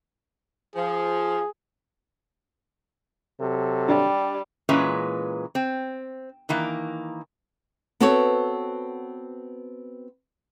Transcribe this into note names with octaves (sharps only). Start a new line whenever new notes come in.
F3 G#4
C3 F#3 A4
G3 D4 G4
A#2 E3 G#3 C#4 B4
C4
D#3 E3 A#3
B3 C4 F#4 A4 B4 C#5